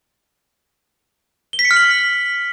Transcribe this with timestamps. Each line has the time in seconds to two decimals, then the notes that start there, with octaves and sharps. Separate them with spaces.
1.53 G7
1.59 B6
1.65 C#7
1.71 F6
1.76 F#7